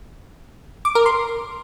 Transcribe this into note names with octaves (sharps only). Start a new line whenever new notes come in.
D6
A#4
C6